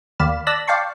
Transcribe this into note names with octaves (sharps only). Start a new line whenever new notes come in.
D#2 D5 F5 B5 E7
D5 A5 E6 F#6 A#6 B6
D5 F5 G5 A5 C6 C#6